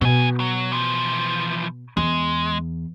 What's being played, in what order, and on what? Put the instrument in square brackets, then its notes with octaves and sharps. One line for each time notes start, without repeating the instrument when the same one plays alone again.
[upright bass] B2 [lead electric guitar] F#3 G#5
[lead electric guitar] F#3
E3 F3
[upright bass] E2 [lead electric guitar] G#3